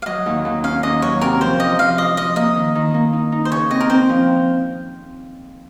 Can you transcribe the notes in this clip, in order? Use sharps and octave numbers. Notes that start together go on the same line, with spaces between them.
F5
F#3 D#5
D#2
D#2
C#4 F5
D#2 D#5
F#3 C#5
C3 A#4
F3 C5
F3 D#5
F3 F5
F4 D#5
F3 D#5
A#3 D#5
D#3
D#3
A#3
D#4
D#4
C5
C#3 C#5
C4 D#5
A#4
C4 C5
F3